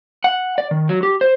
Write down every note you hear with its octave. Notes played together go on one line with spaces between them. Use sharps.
F#5
D5
D#3
F#3
G4
C5